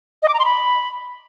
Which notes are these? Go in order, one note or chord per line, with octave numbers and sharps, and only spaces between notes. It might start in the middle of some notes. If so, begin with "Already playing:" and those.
D#5
D6
A#5
C6
B5